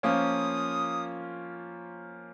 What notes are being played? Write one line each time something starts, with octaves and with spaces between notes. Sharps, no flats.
F3 A#3 C#4 F4 D#6